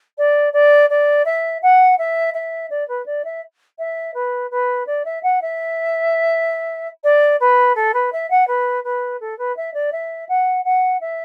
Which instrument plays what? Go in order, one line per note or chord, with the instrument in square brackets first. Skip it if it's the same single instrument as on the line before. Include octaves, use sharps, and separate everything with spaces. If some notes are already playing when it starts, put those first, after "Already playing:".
[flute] D5
D5
D5
E5
F#5
E5
E5
D5
B4
D5
E5
E5
B4
B4
D5
E5
F#5
E5
D5
B4
A4
B4
E5
F#5
B4
B4
A4
B4
E5
D5
E5
F#5
F#5
E5